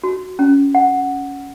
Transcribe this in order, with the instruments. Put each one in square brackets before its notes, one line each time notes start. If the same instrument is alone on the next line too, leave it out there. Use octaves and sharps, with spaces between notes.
[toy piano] F#4
C#4
F#5